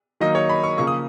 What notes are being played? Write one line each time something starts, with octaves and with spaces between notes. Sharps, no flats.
D#3 F#3 A#3 D#4 D#5
C#5
B5
C#6
C#3 F3 A#3 C#6
D#6